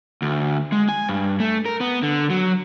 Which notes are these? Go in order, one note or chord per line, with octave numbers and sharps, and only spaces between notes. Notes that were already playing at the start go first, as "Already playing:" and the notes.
D2
G#3
G#5
G2
A3
A#4
B3
D3
F#3